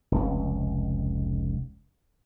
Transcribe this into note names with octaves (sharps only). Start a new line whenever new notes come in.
F1 C#2